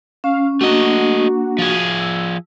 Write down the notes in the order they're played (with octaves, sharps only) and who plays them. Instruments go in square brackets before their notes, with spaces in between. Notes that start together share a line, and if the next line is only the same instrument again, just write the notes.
[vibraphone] C#4 [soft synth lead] F5
[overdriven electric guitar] A3 D#5 [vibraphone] A#3 D4 [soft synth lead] F#4
[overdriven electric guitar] F3 G#4
[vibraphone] E6